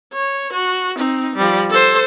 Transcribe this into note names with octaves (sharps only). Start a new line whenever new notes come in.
C#5
F#4
C4 D#4
F3 G3
A4 C5